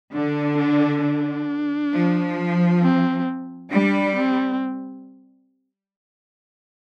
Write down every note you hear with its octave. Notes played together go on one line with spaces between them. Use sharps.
D3 D4
D4
D4
F3
C4
G3 D4
C4